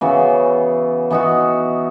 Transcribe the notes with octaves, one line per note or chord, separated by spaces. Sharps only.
C#3 E3 B3 F#4
E3 B3 D#4 F#4